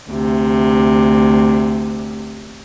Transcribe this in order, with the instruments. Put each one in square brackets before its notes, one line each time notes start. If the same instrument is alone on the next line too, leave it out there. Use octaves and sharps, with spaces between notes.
[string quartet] D2 C3